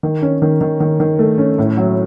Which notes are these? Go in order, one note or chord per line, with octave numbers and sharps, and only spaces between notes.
D#3
C#4
D#3
D#3
D#3
D#3
A3
C#4
A2
F#3